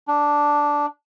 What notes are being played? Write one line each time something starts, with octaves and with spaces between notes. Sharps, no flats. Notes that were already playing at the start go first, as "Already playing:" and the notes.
D4